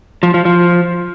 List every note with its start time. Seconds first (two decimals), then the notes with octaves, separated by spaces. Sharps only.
0.23 F3
0.34 F3
0.45 F3